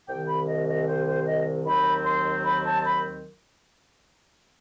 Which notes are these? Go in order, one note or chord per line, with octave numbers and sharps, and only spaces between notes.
C2 C3 D#3 G5
B5
D#5
D#5
C5
C5
D#5
D#2 D#3 F#3 C4 B5
C6
B5
A5
B5